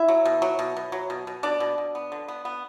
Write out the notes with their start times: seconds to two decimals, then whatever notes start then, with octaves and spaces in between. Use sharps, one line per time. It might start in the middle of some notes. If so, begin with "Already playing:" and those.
Already playing: E4 E5
0.08 F#3
0.25 B2
0.42 F#3
0.59 B2
0.77 B2
0.92 F#3
1.10 B2
1.27 B2
1.43 B2 D4 D5
1.60 B2
1.78 B2
1.95 B3
2.12 D3
2.28 B3
2.45 B3